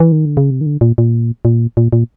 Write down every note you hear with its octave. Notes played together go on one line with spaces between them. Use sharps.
E3
D#3
D3
C#3
C3
D#3
D3
A#2
A#2
A#2
A#2
A#2